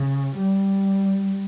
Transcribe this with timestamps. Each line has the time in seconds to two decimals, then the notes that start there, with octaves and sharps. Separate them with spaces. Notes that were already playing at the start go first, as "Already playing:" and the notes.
Already playing: C#3
0.37 G3